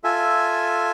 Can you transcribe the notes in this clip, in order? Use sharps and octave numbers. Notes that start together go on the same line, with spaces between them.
F4 A4 E5 G#5